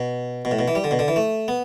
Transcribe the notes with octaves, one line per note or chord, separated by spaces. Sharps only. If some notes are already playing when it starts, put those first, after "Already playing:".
Already playing: B2
B2
A2
B2
E3
G3
D3
B2
D3
E3
A3
B3